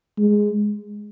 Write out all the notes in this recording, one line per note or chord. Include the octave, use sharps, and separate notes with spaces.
G#3